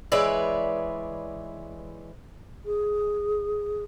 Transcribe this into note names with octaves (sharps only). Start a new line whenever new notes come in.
E3 G#3 B4 C#5 D5 E5
G#4